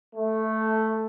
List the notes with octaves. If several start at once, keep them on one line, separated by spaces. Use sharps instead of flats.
A3